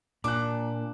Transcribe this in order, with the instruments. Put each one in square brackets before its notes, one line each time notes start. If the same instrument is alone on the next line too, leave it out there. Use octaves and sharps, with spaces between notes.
[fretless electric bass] A#2 [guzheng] D4 [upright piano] D6 F#6